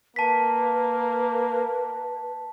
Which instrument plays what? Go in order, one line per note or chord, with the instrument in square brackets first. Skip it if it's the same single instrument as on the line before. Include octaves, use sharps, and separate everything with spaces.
[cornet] A#3 [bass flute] B4 [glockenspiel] A5 B6